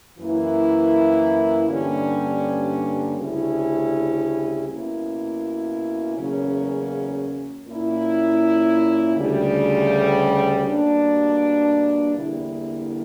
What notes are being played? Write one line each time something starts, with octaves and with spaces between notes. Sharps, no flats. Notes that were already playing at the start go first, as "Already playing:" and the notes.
F#2 E3 A#3 E4
G2 D3 G3 A#3 C#4
D2 C#3 G3 C#4 E4
B2 A#3 C#4 E4
E2 C#3 F#3 A#3 C#4
A#2 A#3 C#4 E4
D2 C#3 G3
B2 G3 A#3 D4
E2 D3 G3 A#3 E4